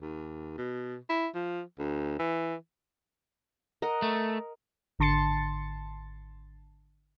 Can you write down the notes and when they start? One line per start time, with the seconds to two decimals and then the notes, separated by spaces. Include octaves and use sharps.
0.01 D#2
0.58 B2
1.10 E4
1.35 F3
1.79 D2
2.19 E3
3.82 A#4 D#5 F#5
4.02 A3
4.99 G#1 D3 A5 C6 A6 C#7